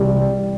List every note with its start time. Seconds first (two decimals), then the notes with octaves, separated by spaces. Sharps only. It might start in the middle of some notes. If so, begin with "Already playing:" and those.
Already playing: C2 C3 E3 G3